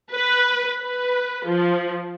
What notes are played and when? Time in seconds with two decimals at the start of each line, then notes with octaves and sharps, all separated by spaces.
0.13 B4
0.81 B4
1.47 F3